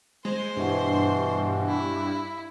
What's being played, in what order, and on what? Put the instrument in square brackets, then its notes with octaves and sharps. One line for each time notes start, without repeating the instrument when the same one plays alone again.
[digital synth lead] G#3 [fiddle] C5 C6
[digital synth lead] G2 [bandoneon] B2 E3
[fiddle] E4